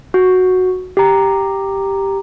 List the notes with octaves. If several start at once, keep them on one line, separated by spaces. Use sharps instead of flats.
F#4
G4 A#5